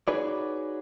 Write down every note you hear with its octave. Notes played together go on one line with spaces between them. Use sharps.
D#4 F#4 G#4 B4 C#5 D5